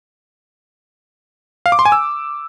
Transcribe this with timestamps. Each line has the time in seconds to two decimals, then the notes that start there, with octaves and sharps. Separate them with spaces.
1.66 F5
1.72 D6
1.79 C6
1.85 G#5
1.92 E6